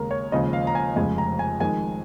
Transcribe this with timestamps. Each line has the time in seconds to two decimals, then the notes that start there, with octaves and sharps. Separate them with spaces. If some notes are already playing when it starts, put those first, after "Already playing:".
Already playing: D#2 C#3 G#3 A#4
0.11 C#5
0.32 D#2 C#3 F3 G#3 D#5
0.53 F5
0.67 A#5
0.75 G#5
0.96 F1 F2 C#3 G#3 G#5
1.18 A#5
1.39 G#5
1.60 F2 D#3 G#3 G#5